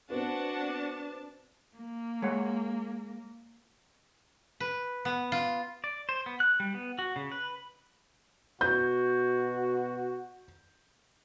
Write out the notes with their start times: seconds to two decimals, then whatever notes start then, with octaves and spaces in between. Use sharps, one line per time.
0.10 B3 C4 D4 F#4 F#5 A5
1.78 A#3
2.22 G#3 C#5 F#5
4.60 B4
5.05 B3
5.32 F4
5.84 D5
6.09 C5
6.26 B3
6.40 F#6
6.60 G3
6.74 B3
6.99 F#4
7.16 C#3
7.32 B4
8.61 B2 F#4 G6